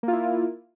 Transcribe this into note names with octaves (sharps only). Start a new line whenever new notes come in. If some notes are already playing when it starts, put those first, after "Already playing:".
A#3 E4 F4